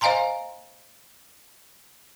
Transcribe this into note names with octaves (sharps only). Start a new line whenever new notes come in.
C5 D#5 F5 G#5 A#5 C6